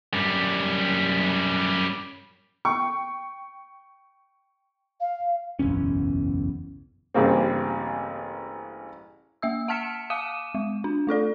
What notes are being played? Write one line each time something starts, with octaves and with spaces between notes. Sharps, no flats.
F#2 G3
G5 C#6
F5
F#1 B1 E2 C#4
A1 G2 C#3 A#3 C4
A#3 E5 E6
F#5 A5 F6 B6 C#7 E7
F5 D6 D#6 D#7 E7
G#3
D4
A3 F4 A4 D5